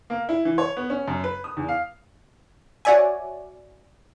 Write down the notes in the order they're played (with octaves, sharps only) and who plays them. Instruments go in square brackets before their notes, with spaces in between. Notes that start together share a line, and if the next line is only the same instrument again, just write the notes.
[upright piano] A#3
E4
E3
C#5
B3
C#4
F#2
B4
D#6
E2
F5
[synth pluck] F#4 C#5 D5 E5 G#5